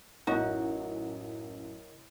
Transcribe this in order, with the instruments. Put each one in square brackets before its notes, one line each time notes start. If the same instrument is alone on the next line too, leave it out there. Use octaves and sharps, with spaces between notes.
[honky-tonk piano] A1 F#2 [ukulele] D#4 [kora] F#4 [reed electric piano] A#4 C#5 D#5